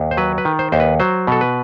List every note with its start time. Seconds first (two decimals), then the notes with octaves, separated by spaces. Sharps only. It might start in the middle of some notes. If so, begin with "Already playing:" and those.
Already playing: D#2
0.11 C5
0.17 F#3 B4
0.38 B4
0.45 D#3
0.59 C5
0.72 D#2 C5
0.80 B4
1.00 F#3 C5
1.27 B2 A4
1.41 B4